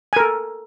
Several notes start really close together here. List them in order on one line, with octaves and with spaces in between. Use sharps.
G#5 A#4 A4